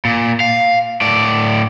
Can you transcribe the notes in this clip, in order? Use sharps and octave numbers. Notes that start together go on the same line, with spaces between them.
A#2
F5
A2 D5